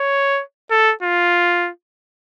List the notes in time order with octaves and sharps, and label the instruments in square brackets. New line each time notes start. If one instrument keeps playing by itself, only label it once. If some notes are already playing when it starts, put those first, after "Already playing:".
Already playing: [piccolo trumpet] C#5
A4
F4